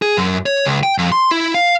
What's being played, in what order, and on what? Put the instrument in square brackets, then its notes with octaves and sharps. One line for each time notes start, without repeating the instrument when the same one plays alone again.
[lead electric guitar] G#4
F#2
C#5
C#2
G5
F2
C6
E4
F5